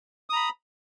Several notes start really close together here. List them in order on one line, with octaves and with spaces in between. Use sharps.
D#6 A#5 B5